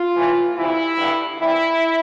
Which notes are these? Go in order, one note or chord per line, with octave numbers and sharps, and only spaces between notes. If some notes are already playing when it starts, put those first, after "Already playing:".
Already playing: F4
A2 E3 A3
D2 C3 E3 E4
G2 D3 G3
E2 C3 G3 E4